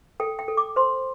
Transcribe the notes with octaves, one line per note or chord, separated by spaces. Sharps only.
A4 G5
G5
A4
D6
C5 C6